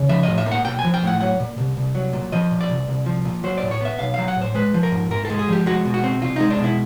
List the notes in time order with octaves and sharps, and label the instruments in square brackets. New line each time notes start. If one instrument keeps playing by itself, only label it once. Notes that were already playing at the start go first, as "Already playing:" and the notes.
Already playing: [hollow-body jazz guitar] C#3
F3 E5
D#5
A2
E5
A#3
F#5
B1 G5
G#5
F3
G5
A2 F#5
F#3 F#5
A#2
C2
C2
F#3
A#2
F3 D#5
A#2
D5
C2
C2
F3
A#2
F#3 C5
D5
A2
C#5
B3 E5
B1 F5
F#3 F5
F#5
A2 C5
G#3 B4
F3
A#4
G#2
G#2 A#4
A4
G#3
G#4
F3 G4
G#3 F#4
B2
F#4
C4
C2 F4
G#3 D#4
D4
B2
E4